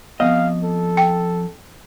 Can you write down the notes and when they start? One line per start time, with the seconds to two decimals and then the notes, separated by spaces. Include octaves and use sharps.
0.20 F2 D#3 B3 D#5 F5
0.63 A4
0.97 G5